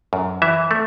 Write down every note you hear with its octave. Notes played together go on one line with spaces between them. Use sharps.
F#2
E3 E5
A3